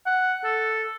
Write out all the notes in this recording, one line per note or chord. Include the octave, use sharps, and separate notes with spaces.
F#5
A4